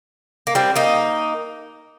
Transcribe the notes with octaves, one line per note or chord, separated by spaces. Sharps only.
A#3
G3 C4
A#3 D#4